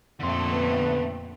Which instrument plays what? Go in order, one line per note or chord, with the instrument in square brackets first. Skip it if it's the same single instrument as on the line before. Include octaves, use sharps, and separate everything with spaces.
[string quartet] F2 A#2 A3 [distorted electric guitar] D3 C6
[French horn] B3